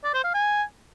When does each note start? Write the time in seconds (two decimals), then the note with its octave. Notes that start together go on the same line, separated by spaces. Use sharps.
0.04 D5
0.14 C5
0.24 F5
0.34 G#5